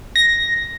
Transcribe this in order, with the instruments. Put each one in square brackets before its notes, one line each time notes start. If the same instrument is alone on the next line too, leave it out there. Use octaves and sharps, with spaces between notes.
[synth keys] A#6